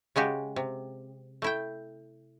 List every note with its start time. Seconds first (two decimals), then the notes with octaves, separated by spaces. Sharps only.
0.16 C#3 G#3 F#4 G4
0.56 C3
1.42 A3 E4 G5